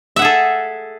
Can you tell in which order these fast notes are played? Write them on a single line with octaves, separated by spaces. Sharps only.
E5 F#5 G#4 A4